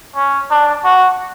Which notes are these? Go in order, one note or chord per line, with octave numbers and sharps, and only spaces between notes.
C#4
D4
F#4